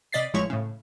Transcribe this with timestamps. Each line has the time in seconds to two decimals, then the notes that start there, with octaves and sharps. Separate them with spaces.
0.12 C3 D5 D#5 A6 B6 C7
0.34 A1 F3 G#3 E4 C#5 C#6
0.50 A2 C#3